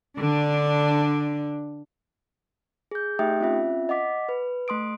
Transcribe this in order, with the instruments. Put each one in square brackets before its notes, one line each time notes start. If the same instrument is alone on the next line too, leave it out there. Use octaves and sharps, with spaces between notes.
[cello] D3 D4
[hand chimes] G#4 G6
A3 D#4 G4 E5 G5 D#6
C4 C#4 F4 E5
D#5 F#5 D6 B6
B4
A3 C6 D#6 D7